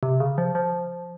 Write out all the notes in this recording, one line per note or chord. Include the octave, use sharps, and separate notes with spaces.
C3
C#3
F3
F3